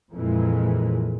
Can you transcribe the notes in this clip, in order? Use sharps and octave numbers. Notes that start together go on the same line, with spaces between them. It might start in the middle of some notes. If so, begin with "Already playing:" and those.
F2 A#2 E3 G#3